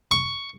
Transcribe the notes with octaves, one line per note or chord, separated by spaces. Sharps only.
C#6